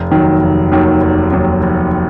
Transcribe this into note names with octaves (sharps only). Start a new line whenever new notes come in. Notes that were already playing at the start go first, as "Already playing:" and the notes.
Already playing: F1
D#2 D#3 F#3
F1
D#2 D#3 F#3
F1
D#2 D#3 F#3
F1